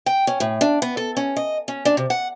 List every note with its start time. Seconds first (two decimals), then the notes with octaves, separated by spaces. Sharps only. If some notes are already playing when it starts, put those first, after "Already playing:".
0.06 G5
0.27 C#4
0.40 A2
0.61 D4
0.82 B3
0.97 A4
1.17 C#4
1.36 D#5
1.68 C#4
1.85 D4
1.97 C3
2.10 F#5